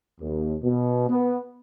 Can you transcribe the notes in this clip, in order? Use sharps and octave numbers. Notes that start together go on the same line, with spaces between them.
D#2
B2
B3